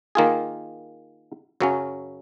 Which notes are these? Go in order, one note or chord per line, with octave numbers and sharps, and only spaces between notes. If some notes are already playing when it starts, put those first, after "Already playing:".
D#3 A#3 F4 G#4
F#2 C#3 F#3 C#4